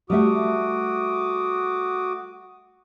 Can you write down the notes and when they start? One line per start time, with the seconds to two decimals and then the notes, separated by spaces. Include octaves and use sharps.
0.10 G3 A3 F#4 E5 D6 D#6